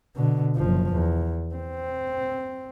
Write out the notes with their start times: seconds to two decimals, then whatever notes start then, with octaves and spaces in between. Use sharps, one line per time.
0.15 B2 D3
0.56 F#1 F3
0.94 E2
1.55 C4